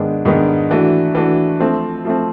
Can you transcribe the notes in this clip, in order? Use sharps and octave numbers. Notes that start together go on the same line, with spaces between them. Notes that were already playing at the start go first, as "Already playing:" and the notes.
Already playing: G#2 D#3 G#3 B3 D4
G#2 D#3 G#3 B3 D4
E3 A3 D4 F#4
E3 A3 D4 F#4
F3 A3 C4
F3 A3 C4